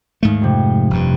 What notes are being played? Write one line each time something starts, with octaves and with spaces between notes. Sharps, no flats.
D#2 G#2 A3 F5
F2 C3
F1 G2